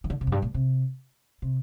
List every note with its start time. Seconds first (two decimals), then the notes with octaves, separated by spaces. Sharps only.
0.04 E3
0.10 D3
0.21 C3
0.27 F2
0.32 G2
0.42 A#2
0.54 C3
1.42 C3